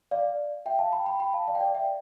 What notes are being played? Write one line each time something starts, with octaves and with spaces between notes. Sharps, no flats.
D5 F5
E5 G5
F5 A5
G5 B5
G5 B5
G5 B5
F5 A5
D5 F5
G5
D5 F5
E5 G5